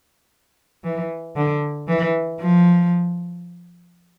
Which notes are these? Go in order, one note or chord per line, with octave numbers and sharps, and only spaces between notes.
E3
D3
E3
F3